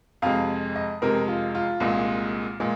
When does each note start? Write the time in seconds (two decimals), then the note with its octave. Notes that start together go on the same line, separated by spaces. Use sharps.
0.22 F2 C3 G#3 F5
0.76 D#5
1.02 F2 C3 G#3 A#4
1.28 F4
1.55 F4
1.80 C2 A#2 G#3
2.60 A#2 G#3